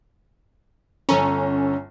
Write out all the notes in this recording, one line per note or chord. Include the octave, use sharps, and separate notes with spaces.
G1 C#4 A4 A#5